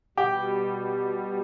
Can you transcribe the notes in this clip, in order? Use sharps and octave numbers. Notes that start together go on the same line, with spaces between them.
B2 G3 G4